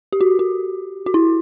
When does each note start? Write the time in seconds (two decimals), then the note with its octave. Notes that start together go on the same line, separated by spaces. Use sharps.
0.13 G4
0.21 F#4
0.39 F#4
1.06 F#4
1.14 E4